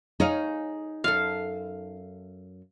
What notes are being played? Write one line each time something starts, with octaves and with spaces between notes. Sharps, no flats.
D#4 G#4 C#5 F5
F#2 A4 F5